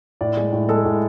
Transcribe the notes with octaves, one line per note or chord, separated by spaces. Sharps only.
A2 D5
G#3
A2
G#3 A4
A2